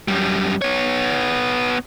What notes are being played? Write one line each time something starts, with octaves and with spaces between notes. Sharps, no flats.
F#2 G3
B3 C#5